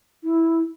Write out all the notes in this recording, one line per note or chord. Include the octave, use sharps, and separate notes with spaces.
E4